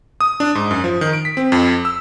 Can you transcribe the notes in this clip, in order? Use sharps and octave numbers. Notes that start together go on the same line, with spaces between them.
D#6
D4
G#2
F#2
F3
D#3
D7
B6
C4
F2
E6